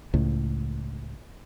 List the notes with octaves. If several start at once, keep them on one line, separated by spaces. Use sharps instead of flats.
C#2 A2